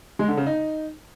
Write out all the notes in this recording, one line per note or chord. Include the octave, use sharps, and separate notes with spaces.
G#3
D3
C#3
D#4